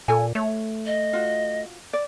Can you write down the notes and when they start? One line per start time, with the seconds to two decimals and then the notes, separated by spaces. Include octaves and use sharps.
0.08 A#2 A4 G#5
0.35 A3 C#5
0.86 D#5
1.13 F4 F#4
1.93 D5